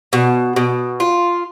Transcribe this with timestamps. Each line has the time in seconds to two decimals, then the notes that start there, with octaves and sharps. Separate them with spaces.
0.13 B2
0.56 B2
1.00 F4